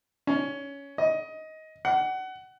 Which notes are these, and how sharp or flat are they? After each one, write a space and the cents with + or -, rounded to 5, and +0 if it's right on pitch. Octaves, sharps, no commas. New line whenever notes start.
C#4 +15
D#5 +15
F#5 +25